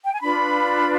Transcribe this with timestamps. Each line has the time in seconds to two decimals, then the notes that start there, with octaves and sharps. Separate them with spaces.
0.05 G5
0.13 G#5
0.21 D4 F4 B4 B5